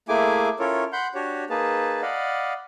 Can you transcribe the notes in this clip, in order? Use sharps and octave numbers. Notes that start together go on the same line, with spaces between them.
A3 A#3 E4 G#4 G#5 D6
C#4 E4 F4 A4 A#4 C#5
F#5 B5 C6 G6
D4 F#4 G4 C#5
A#3 D#4 G#4 B4 A5
D5 D#5 F5 F#5 B5